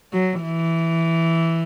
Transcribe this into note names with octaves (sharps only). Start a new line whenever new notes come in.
F#3
E3